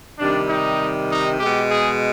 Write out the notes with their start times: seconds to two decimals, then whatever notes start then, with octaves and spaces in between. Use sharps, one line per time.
0.19 C3 D#3 G3 D4
0.49 D#4
1.10 D#4
1.39 B2 G#3 G4
1.70 G#4